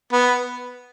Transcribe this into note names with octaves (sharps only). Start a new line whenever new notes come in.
B3